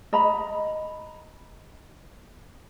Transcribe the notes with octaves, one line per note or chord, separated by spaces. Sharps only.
D#5 A#5 B5